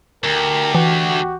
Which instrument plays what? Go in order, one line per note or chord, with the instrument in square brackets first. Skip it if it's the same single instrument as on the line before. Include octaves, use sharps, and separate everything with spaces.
[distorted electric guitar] D2 [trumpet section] G4 [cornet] A#4
[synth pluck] E3 [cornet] F#4